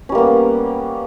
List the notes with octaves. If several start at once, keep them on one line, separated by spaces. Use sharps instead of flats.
G3 A#3 B3 C#4